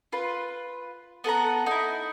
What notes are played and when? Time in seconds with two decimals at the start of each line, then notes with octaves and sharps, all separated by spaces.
0.12 F4 B4
1.24 B3 A4 F#5 A#5
1.66 D#4 E4